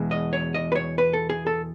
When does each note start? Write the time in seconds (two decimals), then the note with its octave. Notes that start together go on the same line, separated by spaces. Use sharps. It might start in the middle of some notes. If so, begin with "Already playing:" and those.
Already playing: E2 B2 G#3
0.11 D#5
0.33 C#5
0.54 D#5
0.72 B4
0.75 C#5
0.98 B4
1.13 A4
1.30 G#4
1.47 A4